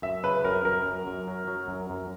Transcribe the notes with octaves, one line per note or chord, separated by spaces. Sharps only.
F#2 E5
C#3 B4
F#2 A#4
F#2 A#4
F#2
F#2
F#3
F#3
F#2
F#2